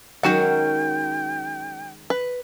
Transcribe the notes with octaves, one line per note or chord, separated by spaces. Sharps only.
D#3 F#3 G#3 C#4 F#4 F#5 G5
B4